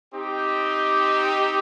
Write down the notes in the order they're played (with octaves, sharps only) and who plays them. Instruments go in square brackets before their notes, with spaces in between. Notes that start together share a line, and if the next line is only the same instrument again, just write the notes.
[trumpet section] C4 D#4 G4